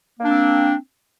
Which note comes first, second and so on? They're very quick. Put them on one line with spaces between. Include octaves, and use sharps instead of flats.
A#3 D4 C4